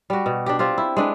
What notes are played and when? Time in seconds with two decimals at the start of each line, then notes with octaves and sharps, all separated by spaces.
0.10 G3 F#4
0.26 B2
0.46 D4 G4
0.59 C4 F4 G4
0.78 E4
0.97 G#3 D4 B4